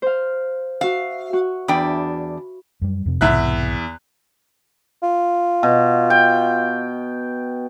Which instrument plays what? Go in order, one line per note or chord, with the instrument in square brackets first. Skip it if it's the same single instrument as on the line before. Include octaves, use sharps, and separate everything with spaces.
[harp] C5 F5
[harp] F#4 E5 [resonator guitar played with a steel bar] F5
[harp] F#4
[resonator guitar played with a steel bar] E2 D4 G5 [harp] B5
[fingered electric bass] F#2 G3
F2 C3
[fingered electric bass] B1 G#2 C3 [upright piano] E2 E5 F#6
[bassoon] F4
[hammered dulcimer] B2
G5